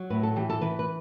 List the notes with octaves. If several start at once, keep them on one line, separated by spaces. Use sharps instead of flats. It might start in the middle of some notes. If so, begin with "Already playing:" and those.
Already playing: F#3
A2 B4
A4
E3 G4
A4
E3 B4
B4